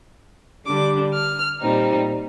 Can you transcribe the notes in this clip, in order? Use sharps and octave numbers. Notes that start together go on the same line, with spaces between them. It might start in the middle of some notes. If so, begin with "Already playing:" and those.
D3 G3 D4 D6
F6
A#2 G3 C4 D#4